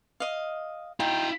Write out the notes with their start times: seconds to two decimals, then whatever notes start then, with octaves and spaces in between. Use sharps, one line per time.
0.20 D#5 F5
1.00 D#4 E4 F5 G5